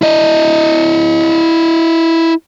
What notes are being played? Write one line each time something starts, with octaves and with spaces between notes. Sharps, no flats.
E4 D#5